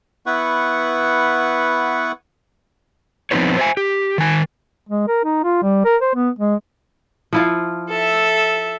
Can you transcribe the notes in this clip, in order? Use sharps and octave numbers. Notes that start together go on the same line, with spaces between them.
B3 E4 B4 F#5 C#6
F3 B3 C4 D#4 B4 C#5
C5 E5 G#5
G4
D#3 G#5
G#3
A#4
D#4
F4
G3
A#4
C5
B3
G#3
F3 E4 F4
A4 E5